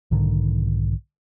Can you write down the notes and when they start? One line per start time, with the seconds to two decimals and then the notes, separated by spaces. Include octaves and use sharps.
0.11 B1 G#2 D3 D#3